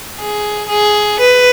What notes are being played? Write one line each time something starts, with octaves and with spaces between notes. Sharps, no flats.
G#4
G#4
B4